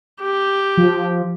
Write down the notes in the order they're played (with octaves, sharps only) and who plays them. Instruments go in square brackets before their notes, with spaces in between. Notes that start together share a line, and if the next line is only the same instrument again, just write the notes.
[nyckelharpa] G4
[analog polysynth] F3